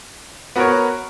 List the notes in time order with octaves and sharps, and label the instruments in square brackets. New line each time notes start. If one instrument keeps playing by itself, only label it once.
[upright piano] B3 F#4 A#4 C#5